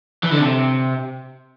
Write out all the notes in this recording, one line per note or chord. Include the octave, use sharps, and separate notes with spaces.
E3
D3
C3